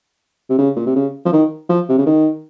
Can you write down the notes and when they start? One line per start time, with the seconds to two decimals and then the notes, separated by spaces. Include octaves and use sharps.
0.50 C3
0.58 C#3
0.76 A#2
0.86 C3
0.96 C#3
1.25 F3
1.33 D#3
1.69 F3
1.89 C3
1.98 C#3
2.06 D#3